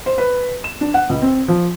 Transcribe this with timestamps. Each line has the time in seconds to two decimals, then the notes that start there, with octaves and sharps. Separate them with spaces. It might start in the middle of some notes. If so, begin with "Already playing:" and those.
0.06 C5
0.18 B4
0.64 E7
0.81 D4
0.94 F#5
1.09 C#2
1.22 C4
1.48 F3